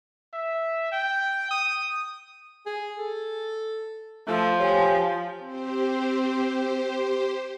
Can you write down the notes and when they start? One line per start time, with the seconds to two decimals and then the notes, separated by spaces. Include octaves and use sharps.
0.34 E5
0.92 G5
1.51 D#6
2.66 G#4
2.98 A4
4.28 F3 A3
4.60 G4 C#5 G#5
5.45 C4 G4 C5